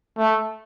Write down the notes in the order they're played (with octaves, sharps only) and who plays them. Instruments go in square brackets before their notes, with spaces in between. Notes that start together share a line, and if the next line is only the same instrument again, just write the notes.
[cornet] A3